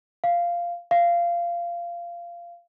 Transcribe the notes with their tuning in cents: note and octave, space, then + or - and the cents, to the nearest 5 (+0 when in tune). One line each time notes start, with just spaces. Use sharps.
F5 -10
F5 -20